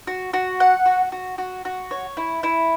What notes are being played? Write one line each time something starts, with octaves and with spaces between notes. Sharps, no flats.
F#4
F#4
F#5
F#4
F#4
F#4
F#4
C#5
E4
E4